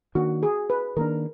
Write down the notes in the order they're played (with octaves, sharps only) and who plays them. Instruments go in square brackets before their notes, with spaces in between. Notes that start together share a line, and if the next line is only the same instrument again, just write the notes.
[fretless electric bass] D#3 A#3 D4 [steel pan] F#4
[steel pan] G#4
B4
[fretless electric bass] D#3 A#3 D4 [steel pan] A#4